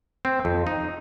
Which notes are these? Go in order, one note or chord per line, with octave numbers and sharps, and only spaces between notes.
C4
F2
D#4